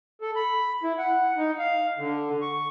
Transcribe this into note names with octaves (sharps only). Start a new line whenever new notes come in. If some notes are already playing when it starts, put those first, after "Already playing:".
A4
B5
E4
F#5
D#4
F5
D3
C#6